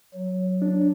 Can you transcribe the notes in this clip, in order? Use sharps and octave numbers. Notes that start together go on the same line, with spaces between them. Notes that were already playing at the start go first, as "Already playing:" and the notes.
F#3
D4